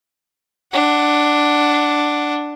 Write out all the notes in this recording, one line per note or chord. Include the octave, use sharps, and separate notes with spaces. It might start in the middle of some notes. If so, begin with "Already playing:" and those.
D4 F#5